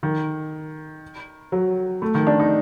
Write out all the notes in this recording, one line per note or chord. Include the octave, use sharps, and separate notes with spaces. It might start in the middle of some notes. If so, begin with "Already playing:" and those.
D#3
F#3
A3
D#3
D4
D#4